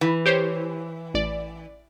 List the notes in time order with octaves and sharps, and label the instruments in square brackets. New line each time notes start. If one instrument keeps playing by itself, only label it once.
[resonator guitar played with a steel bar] E3
[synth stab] G4 C5 C#5
A1 D5